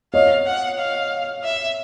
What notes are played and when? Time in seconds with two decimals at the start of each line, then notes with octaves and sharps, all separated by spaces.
0.13 C#5 D#5 F5
0.46 F#5
0.78 F5
1.44 E5